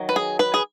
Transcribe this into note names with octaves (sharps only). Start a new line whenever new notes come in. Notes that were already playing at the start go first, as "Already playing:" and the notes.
Already playing: D#3 F#3
B4
G#4
B4
G#4